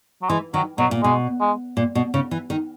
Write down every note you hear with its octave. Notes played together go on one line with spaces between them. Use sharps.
F#3
E3 G#3
D#3 F#3
B2 F#3
A#2
B2 G#3
G#3
A#2
B2
C#3
E3
D#3